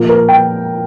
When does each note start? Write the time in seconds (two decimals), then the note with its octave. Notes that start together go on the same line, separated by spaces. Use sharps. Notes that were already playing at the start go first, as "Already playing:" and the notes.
Already playing: A#2 F3 A#3
0.09 A#4
0.29 G5